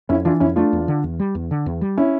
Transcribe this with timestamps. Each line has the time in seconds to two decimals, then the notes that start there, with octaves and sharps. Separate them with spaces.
0.09 F2 C#4 E4
0.25 E3 D4 F4
0.40 F2 C#4 E4
0.56 A3 D4 F4
0.73 E2
0.88 D3
1.04 E2
1.19 G3
1.35 E2
1.51 D3
1.66 E2
1.81 G3
1.98 C#4 E4